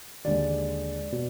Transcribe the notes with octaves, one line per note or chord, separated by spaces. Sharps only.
D#2 D3 G#3 D5
B2